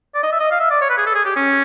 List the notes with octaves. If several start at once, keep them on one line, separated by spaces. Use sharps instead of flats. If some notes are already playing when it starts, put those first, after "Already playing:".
D5
D#5
E5
D#5
F5
E5
D5
C#5
B4
G#4
A4
G#4
G4
C#4